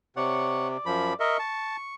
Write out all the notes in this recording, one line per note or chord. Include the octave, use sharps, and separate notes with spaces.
C3 C#5 D5 F#5
D5
F#2 F3 B5
A#4 D#5 E5 C#6
A5